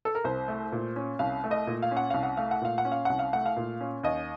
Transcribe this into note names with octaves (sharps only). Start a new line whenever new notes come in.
A4
A#4
C2 C5
A3
A#2
C#4
C2 F5
A3
D#5
A#2
F5
C#4
F#5
C2 F5
F#5
A3 F5
F#5
A#2 F5
F#5
C#4
F5
C2 F#5
F5
A3 F#5
F5
A#2
C#4
D#2 D#5